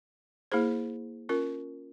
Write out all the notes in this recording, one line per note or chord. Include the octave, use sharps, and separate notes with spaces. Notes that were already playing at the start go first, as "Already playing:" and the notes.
A#3 E4 G#4 C5
C#4 F4 A#4